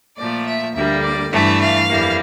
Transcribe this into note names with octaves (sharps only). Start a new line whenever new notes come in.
A#2 F3 A3 D5
E5
D2 D3 G3 A#3 E5
D5
G2 E3 A3 E5
F5
F2 E3 G3 A#3